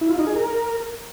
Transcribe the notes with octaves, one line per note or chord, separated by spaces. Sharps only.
E4
F4
D#4
G#4
A#4